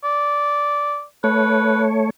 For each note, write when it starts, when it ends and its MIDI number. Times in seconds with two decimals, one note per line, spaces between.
0.04 1.03 74
1.24 2.10 57
1.24 1.84 71
1.24 2.10 73